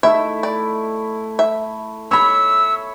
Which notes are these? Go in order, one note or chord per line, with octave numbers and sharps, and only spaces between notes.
A3 E4 E5
D5
E5
C#5 B5 E6